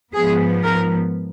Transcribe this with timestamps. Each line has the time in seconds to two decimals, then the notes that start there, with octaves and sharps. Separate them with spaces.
0.14 G#2 F3 B3 G#4
0.63 A#4